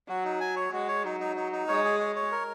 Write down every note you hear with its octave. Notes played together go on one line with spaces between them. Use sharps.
F#3 F#4
D#4
G#5
C#5
G#3 F#4
C#5
F#3 D#4
D#4
D#4
D#4
G#3 C#5
G#4
C#5
C#5
A#4